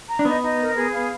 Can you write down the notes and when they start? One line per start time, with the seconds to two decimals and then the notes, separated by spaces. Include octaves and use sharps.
0.08 A#5
0.19 D4
0.25 B3 D#4
0.43 D#4
0.59 A#4
0.76 G#4
0.92 F5